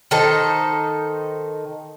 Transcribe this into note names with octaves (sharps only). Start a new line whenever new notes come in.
D#3 D#4 A4 C5